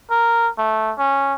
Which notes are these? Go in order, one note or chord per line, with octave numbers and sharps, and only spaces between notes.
A#4
A3
C#4